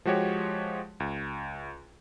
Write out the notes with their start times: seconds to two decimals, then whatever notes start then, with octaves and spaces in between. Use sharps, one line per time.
0.05 F3 G#3 F#4 G4 C#5
1.00 C#2